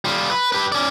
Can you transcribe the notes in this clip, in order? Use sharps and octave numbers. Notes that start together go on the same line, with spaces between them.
G3 F4
B4
G4 B4
C#4 D5